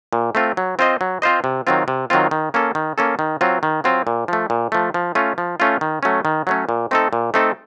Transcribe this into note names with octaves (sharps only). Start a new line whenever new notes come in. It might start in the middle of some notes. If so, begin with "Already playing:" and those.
A#2
A3 C4 F4
F#3
C4 F4 C5 D#5
F#3
C4 F4 C5 D#5
C3
D#3 F#3 C4 F4
C3
D#3 F#3 C4 F4
D#3
A#3 C#4 A4
D#3
A#3 C#4 A4
D#3
F#3 C4 F4
D#3
F#3 C4 F4
A#2
F3 A3
A#2
F3 A3
F3
A3 C#4 F4
F3
A3 C#4 F4
D#3
F#3 A3 C#4
D#3
F#3 A3 C#4
A#2
A3 C4 D#4 A4
A#2
A3 C4 D#4 A4